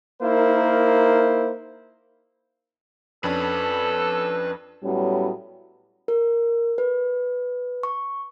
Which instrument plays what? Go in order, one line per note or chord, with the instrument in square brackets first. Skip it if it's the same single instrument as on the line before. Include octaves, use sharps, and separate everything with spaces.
[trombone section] A#3 D#4 E4 A#4 C5
[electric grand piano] F2 C#4 D4 [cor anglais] A4 [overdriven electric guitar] B4
[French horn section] A2 F#3 G3 B3 C#4
[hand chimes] A#4
B4
C#6